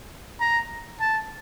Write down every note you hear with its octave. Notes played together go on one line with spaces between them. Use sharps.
A#5
A5